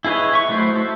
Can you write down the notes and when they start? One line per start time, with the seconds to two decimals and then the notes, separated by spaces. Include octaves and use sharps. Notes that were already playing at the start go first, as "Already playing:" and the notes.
0.05 E4 G#4 B4 C#5 D#5
0.33 E5 C#6
0.49 F#3 A3 E4 C5
0.75 A4 E5